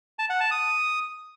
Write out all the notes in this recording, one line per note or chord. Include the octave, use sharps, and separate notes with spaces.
A5
F#5
A5
D#6